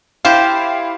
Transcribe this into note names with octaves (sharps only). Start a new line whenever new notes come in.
E4 G4 C5 F5 A5